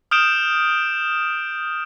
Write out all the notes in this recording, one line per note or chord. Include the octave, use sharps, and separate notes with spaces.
D#6 F6 G6 D7 E7